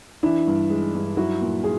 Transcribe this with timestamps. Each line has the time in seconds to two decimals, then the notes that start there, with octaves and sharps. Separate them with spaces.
0.23 E3 D4 E4
0.47 G2
0.70 G#3
0.94 G2
1.17 F#3 E4 F#4
1.41 A#2
1.64 G#4